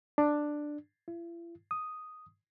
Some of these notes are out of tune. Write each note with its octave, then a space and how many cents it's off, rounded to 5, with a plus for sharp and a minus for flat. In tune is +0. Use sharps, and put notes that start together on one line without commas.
D4 +10
E4 +45
D#6 +0